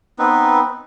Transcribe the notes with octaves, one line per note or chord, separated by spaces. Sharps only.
B3 C4 D#4 B4